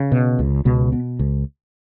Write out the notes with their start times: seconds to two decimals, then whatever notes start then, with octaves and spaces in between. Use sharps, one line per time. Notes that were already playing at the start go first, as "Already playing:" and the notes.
Already playing: C#3
0.12 B2
0.39 C#2
0.65 C#2 B2 B3
0.93 B2
1.19 C#2